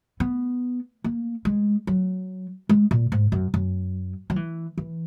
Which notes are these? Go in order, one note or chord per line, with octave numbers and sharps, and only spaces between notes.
B3
A#3
G#3
F#3
G#3
A#2
G#2
F#2
F#2
F#3
E3
E3